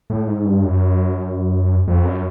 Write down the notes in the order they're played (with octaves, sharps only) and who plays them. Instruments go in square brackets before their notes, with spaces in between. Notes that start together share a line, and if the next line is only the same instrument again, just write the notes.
[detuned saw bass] A2
G#2
G2
F#2
F2
F#2